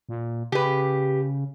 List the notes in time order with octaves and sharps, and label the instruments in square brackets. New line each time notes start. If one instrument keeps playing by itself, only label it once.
[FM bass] A#2
[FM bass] C#3 [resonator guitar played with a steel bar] G4 B4